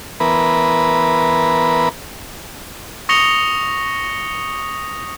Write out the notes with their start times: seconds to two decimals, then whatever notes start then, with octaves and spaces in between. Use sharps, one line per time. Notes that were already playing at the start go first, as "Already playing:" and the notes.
0.20 E3 B3 A#4 B4
3.09 C#6 D#6 A#6 C#7 F7 G7